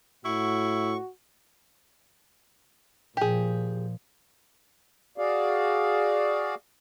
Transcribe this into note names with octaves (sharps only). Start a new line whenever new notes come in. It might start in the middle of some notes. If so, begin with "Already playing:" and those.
A2 E4 F#4 C#6
A#2 F3 G4 G#4
F#4 G#4 D5 F5